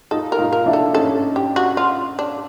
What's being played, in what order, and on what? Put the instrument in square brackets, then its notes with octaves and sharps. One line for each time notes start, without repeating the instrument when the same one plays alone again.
[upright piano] D#4 F4 [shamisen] A4
[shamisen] A#4
[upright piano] D#4 F4
[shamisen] A#4
[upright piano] D4 E4
[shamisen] A4
[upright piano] C#4 D#4 [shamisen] A4
[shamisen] G4
F#4
F4
D4